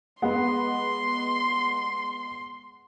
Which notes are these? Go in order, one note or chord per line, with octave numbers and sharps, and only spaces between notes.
G#3 B3 F#5 C6